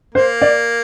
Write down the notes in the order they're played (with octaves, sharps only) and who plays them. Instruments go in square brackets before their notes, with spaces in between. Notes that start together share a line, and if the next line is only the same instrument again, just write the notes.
[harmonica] A#3 [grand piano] C5
[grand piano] D5